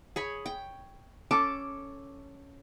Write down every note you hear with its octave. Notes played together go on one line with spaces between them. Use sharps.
G#4 C#5 B5
G5
C#4 A4 A5 D6